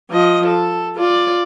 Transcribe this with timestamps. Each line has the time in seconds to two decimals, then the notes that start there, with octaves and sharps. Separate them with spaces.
0.11 F3 D#5
0.47 A4
0.96 F4 D5